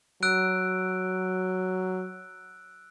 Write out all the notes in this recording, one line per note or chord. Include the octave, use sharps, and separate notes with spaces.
F#3 E6 F#6 D7